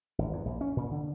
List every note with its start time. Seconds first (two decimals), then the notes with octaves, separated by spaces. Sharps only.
0.18 G#1
0.33 E2
0.45 A#1
0.61 C#4
0.76 A#2
0.91 D3